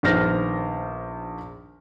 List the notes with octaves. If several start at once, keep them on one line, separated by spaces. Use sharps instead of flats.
A#1 D#3 B3 C5 F6 A#6